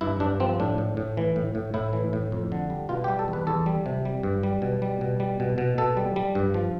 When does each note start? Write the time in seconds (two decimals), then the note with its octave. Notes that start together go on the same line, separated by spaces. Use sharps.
0.01 G2 E4
0.20 G2 D4
0.40 F3 C4
0.60 A2 D4
0.78 A2
0.97 A2
1.17 E3
1.36 A2
1.55 A2
1.74 A2 E4
1.93 E3
2.13 A2
2.32 F2
2.52 D3
2.70 G3
2.89 B2 F4
3.04 G4
3.08 G3
3.19 A4
3.28 E2
3.33 B4
3.47 E2 A4
3.66 G3
3.86 C3
4.05 G3
4.23 G2
4.43 G3
4.62 B2
4.82 G3
5.01 B2
5.20 G3
5.40 B2
5.58 B2
5.78 B2 A4
5.97 G3
6.16 G3
6.35 G2
6.54 F3